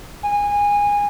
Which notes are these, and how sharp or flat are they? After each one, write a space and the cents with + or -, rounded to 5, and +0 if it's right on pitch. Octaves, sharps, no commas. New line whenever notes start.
G#5 -20